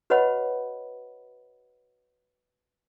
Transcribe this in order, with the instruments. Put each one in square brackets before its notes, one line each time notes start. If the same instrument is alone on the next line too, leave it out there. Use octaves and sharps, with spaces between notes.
[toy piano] F#4 B4 C#5 D#5 F#5 B5